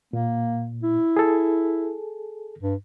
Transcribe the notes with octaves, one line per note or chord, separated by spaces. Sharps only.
A#2 A#3
E4
G#4 A4
G2